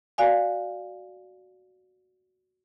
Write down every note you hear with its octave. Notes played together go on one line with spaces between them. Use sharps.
F#4 D5 F5 G#5